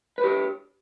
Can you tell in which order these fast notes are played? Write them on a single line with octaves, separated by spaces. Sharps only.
B4 C#5 G4